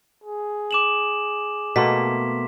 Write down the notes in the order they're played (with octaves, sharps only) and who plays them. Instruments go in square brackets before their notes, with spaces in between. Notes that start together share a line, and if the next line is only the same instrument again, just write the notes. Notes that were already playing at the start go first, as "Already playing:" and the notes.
[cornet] G#4
[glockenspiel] D6 E7 F#7
[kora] B2 A3 A#3 [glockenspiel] C6 B6